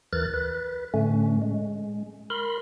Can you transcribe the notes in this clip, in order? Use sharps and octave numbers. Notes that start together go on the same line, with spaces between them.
D#2 E3 A#4 F#6 A6
B4
A2 D3 A3 C#4
G#3
A#4 B5 C6